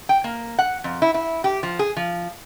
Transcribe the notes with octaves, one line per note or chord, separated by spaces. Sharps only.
G5
A#3
F#5
F2
E4
E4
G4
F3
G#4
F3